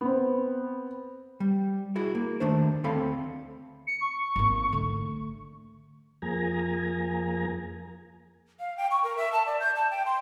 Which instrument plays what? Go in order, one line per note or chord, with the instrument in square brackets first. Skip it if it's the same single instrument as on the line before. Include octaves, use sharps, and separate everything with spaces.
[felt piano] B3 C4
[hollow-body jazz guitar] G3
E4 F#4 G#4
A#3
D#3 A3 D4 C5
D2 C4 A4 F5 B5
[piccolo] C#7
C#6
[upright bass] G#1 A#3
D3 A3
[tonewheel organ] F2 F3 A#3 G#4 G#5 A#5
[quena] F5
G5
C#6
A#4
E5
A5
D5
G6
A5
G5
C6